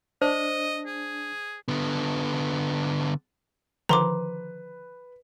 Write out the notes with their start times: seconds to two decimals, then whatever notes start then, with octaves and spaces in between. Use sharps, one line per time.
0.22 D4 C5 D#5
0.87 G#4
1.68 D3 B3
3.89 D3 D#3 F3 B4 A#5 C6 D6